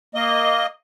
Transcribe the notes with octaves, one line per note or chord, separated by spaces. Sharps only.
A#3 D#5